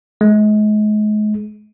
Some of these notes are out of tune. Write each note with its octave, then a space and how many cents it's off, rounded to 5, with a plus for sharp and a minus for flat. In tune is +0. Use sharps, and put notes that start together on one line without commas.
G#3 +35